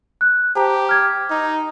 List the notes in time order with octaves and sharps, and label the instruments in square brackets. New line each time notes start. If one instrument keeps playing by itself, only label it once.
[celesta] F#6
[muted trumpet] G4 [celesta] C5 A5 A#5
[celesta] D6 F6 G#6
[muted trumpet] D#4